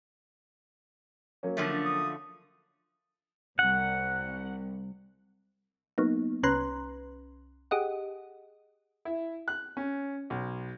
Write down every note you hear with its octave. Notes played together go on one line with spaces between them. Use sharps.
F#3 A#3 C#4
D3 F3 A3
D#6
C2 F#5
F#3 A#3 B3 D#4
C2 C#4 B4 A#5 C6 F#6
G4 G#4 D#5 F#5
E4
F#6
C#4
B1